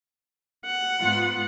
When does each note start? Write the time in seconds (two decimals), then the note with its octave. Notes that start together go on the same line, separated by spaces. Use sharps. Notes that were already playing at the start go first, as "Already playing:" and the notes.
0.66 F#5
0.99 G#2 B3 F4